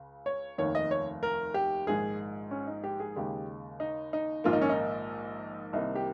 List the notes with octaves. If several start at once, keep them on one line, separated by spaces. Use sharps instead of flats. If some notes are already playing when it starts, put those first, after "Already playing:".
Already playing: C#2 C#3
C#5
F1 D#2 D#3 C#5
D#5
C#5
A#4
G4
A#1 G#2 D#3 G#3 G#4
C#4
D#4
G4
G#4
D#2 C#3 G#3 G4
D#4
D#4
A#1 G#2 D#3 A#3 F4
D#4
C#4
D#4
C2 C3 D#3 A#3 D#4
G4